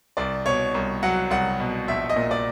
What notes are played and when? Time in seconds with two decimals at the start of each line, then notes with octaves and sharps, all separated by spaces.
0.17 C2 D5
0.46 B2 C#5
0.74 C2
1.03 F#3 F#5
1.30 C2 F#5
1.60 B2
1.87 A#1 E5
2.09 D#5
2.16 A#2
2.31 D5